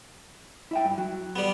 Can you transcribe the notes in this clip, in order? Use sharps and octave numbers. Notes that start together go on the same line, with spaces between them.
E4 E5 G5
G2
F#3
G3 B3